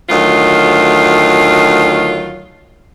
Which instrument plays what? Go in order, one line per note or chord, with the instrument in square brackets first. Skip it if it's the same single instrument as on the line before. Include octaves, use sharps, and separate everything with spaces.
[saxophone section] D2 D#3 F#3 F4